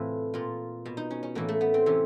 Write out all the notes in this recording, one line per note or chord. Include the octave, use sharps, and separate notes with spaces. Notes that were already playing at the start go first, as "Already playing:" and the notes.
Already playing: A2 C3 E3 F4
A#2 F4
B2
D#4
C#4
C#4
A2 E3 A#3
A3
B3
C4
C3 E3 C#4